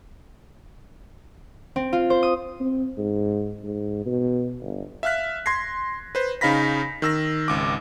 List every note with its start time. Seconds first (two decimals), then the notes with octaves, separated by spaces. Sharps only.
1.76 C4
1.93 F4
2.10 C5
2.23 D#6
2.60 C4
2.98 G#2
3.64 G#2
4.06 B2
4.62 G1
5.03 E5 F5 F6 F#6 B6
5.46 C6 G#6 A#6 C7
6.15 B4 C5
6.41 C#3 D#4 F5 B5 A#6 B6
7.02 D#3 E6 A#6
7.48 G#1 C#2 D6